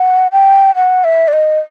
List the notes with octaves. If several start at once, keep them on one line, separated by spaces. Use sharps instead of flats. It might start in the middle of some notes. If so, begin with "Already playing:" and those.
Already playing: F#5
G5
F#5
E5
D5
D#5